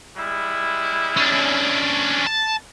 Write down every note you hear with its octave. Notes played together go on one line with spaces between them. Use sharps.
G3 G#3 E4
C#4 D4
A5